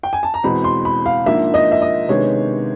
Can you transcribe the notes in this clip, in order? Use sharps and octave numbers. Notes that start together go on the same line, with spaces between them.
G5
G#5
A5
A#5
E2 B2 G#3 C4 B5
C6
B5
F5
G#2 F3 A#3 D4 E5
D#5
E5
D#5
C3 D#3 G#3 B3 D4 C#5